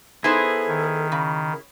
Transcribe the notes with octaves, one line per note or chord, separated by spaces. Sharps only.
B3 D#4 E4 G#4 A4 C5
D#3
C#3 B5